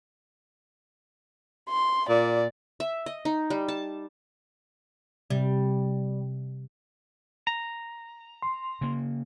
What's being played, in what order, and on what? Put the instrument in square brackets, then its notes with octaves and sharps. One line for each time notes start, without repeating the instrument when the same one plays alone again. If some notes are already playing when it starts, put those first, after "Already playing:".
[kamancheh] C6
[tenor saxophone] A#2 [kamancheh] D5
[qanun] E5
D#5
D#4
G3
A5
[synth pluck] C3 [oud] G3
[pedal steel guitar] A#5
[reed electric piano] C6
[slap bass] C#3 A#3